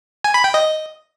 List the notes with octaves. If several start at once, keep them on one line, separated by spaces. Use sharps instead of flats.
G#5
B5
G5
D#5